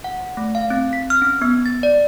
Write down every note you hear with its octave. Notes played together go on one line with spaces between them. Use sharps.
F#5
A3
F5
C4
B6
F6
C#4
B3
A6
D5